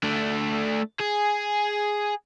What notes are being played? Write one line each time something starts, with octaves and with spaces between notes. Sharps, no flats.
A3 D4
G#4